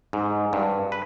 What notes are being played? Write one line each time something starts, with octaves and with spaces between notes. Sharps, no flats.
G#2
G2
B4